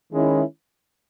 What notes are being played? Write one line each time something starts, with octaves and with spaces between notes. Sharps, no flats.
D#3 G#3 C#4 E4